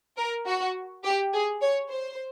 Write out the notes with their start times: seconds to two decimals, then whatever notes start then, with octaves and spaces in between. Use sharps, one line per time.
0.17 A#4
0.46 F#4
1.04 G4
1.32 G#4
1.61 C#5
1.90 C5